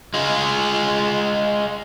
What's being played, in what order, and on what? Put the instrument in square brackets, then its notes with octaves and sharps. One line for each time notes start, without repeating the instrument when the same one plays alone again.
[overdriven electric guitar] G#3 F4